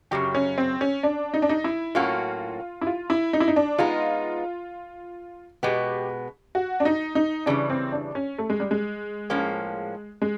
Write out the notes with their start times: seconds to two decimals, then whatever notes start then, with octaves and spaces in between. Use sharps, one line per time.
0.11 F#2 C#3 F#3 G4
0.35 C#4
0.58 C4
0.81 C#4
1.03 D4
1.34 D#4
1.42 D4
1.49 D#4
1.64 E4
1.95 A2 F#3 A#3 C#4 F4 F#4
2.81 E4
2.87 F4
3.10 E4
3.33 D#4
3.40 E4
3.48 D#4
3.56 D4
3.78 G#3 B3 D#4 F4
5.63 B2 G#3 B3 G4
6.55 F#4
6.80 D4
6.85 D#4
7.15 D#4
7.46 C#3 E3 G3 D4
7.70 C4
7.92 D4
8.15 C#4
8.38 A3
8.50 G#3
8.60 G3
8.71 G#3
9.30 A2 F3 A#3 C#4
10.22 G#3